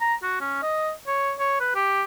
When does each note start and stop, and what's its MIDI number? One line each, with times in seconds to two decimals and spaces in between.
0.01 0.14 82
0.23 0.38 66
0.41 0.62 61
0.63 0.91 75
1.07 1.34 73
1.40 1.59 73
1.60 1.72 71
1.75 2.04 67